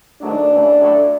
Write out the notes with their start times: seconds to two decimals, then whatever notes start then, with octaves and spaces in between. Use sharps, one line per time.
0.22 G#2 D#3 F#3 A3 D4
0.50 D2 C#3 E3 A3
0.79 A2 F#3 A3